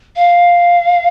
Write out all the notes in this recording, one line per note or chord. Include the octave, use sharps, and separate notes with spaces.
F5